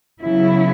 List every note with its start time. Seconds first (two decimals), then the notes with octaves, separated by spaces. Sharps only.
0.23 C#3 F#3 B3 E4